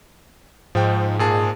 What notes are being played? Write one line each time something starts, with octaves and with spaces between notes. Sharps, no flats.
G#2 F3 G5
A#2 G#4 A5